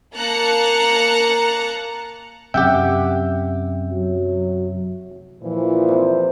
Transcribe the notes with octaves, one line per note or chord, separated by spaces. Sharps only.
A#3 A5 A#5 F#6 C#7
F#2 C3 G4 E5 F#5 G5
F#3
A#2 E3 F3
C3